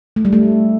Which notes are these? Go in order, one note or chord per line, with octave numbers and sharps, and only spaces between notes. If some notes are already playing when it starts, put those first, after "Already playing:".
A3
G3
A3